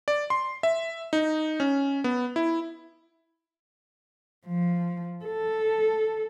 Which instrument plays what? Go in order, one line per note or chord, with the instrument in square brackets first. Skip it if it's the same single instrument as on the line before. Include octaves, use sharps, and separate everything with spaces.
[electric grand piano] D5
C6
E5
D#4
C#4
B3
E4
[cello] F3
A4